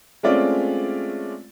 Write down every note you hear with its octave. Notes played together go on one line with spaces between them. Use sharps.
G#3 A3 C4 C#4 F4 D5